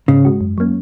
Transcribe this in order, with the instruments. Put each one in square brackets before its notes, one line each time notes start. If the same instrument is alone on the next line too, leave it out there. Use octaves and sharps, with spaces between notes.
[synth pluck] G#2 [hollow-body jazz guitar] C#3
[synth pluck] G#3 F#4
F#2
F#3 A#3 C#4